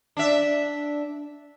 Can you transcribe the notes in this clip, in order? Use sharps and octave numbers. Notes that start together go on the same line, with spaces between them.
D4 E5